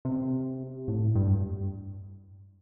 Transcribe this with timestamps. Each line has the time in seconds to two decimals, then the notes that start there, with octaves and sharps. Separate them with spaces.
0.05 C3
0.88 A2
1.15 G2